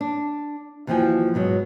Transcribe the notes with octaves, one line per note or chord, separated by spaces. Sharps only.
D4
D#2 E3 F3 F#4 G5 G#5
G#2 B2 F#3 G#3